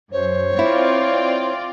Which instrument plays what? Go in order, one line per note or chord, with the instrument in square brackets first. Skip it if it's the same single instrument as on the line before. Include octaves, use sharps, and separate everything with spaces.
[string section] F#2 [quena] C5 [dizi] C#5
[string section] C4 F4 D5 [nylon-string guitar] E4